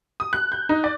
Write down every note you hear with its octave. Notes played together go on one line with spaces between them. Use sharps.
D#6
F#6
G6
D#4
D5